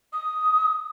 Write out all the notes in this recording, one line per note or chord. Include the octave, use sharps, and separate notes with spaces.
D#6